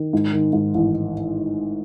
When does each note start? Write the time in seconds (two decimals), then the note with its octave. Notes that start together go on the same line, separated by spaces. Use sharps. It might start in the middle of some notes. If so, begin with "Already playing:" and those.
Already playing: D#3
0.13 G#2
0.33 D#3
0.53 G#2
0.74 A1